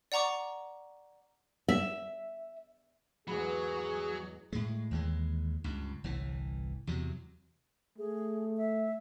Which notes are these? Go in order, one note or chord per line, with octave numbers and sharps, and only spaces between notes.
D5 F#5 A#5 C#6 D6
E5
E2 G#2 F#3 G#4 B5
A2 G#3
D#2 E3 G#3
C#2 G2
G1 C2 E3
E2 C3 F#3
A3 G#4
E5